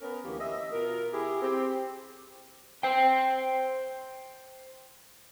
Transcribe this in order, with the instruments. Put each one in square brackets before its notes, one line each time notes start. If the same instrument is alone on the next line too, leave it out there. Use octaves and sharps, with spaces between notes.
[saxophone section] B3 C#4 A#4
D2 E3 A#3 C#4 G4
D#5 E5
B2 F4 A#4
E4 G4 G#4
C4 G4
[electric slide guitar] C5 G5